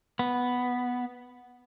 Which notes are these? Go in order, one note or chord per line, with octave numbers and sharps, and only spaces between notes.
B3